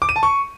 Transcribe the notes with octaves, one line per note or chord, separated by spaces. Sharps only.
D6
D#7
A5
C#6